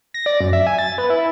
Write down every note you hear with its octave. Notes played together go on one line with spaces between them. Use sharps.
A#6
D5
F#2
E5
G#5
A6
B3
E4